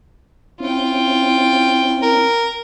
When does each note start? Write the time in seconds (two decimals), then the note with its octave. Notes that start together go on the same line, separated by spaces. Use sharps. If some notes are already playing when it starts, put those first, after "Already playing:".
0.60 C4 C#4 E4 F4 G5
2.02 A#4